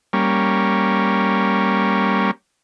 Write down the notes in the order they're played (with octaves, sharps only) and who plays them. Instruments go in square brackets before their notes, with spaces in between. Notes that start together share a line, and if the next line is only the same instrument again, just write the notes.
[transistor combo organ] G3 A#3 C#4